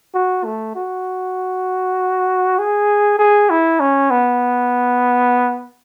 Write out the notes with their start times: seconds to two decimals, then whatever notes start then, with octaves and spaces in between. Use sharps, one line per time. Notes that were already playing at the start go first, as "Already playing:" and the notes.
0.14 F#4
0.45 A3
0.75 F#4
2.59 G#4
3.19 G#4
3.50 E4
3.80 C#4
4.11 B3